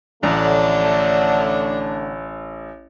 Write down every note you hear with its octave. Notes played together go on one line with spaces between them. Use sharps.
A1 D3 A3 D4 C#5 A#5